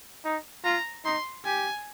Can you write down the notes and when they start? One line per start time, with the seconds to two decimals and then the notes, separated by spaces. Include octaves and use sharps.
0.24 D#4
0.65 F4 A#5
1.04 D#4 C6
1.45 G4 G#5